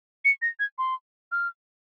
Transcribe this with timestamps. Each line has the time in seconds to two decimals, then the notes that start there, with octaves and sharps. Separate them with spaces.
0.25 C#7
0.42 A#6
0.59 G#6
0.78 C6
1.32 F6